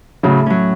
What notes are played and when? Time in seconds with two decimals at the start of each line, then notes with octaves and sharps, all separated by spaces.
0.23 A2 C#3 F#3
0.46 F#3 C#4